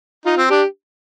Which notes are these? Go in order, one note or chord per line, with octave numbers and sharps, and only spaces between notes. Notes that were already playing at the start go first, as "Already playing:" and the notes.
D#4 F4
C4
D4 G4